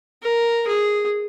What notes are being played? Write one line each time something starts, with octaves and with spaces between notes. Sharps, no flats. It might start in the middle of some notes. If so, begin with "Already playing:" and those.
A#4
G#4